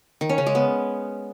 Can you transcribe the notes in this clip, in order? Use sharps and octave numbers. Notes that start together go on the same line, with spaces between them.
D#3
C#4
C#3
G#3
B3